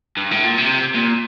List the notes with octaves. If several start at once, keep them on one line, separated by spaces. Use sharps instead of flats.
G2
A2
A#2
C3
A#2